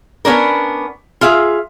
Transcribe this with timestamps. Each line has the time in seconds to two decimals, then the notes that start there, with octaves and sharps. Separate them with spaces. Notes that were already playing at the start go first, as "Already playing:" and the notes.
0.25 B3 C#4 D4 A#4
1.21 F4 G#4 E5 F5